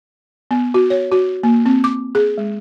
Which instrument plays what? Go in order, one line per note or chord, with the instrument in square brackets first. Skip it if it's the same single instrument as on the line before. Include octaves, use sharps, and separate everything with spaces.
[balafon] B3
F#4
C#5
F#4
A#3
C4
D6
G#4
G#3